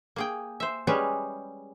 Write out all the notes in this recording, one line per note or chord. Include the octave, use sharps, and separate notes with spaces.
A#3 G#4 G5
C5 E5
G3 G#3 C#4 G4 G#4 B4